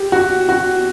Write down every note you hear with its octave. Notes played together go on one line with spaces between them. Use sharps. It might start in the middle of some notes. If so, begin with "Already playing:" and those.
Already playing: G4
F#4
F#4